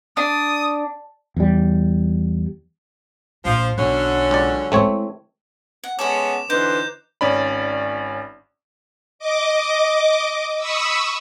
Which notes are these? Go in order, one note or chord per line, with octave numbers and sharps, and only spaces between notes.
D4 D#6
E2 G3
A#1 F3
B1 D3 F#3 C#4
C#2 D5
G#3 A3 C4 E4 C#5
F#5
G#3 B3 C#4 A4 D5 F#5 D6 E7
D3 E3 D#4 B4 C5 G6
G#1 C#4 D5 B5
D#5 D6
B5 C#6 D#6 E6